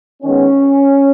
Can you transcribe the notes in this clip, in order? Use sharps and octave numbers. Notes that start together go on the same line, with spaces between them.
D#3 G#3 B3 C#4